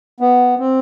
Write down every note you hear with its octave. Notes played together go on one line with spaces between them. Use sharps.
B3
C4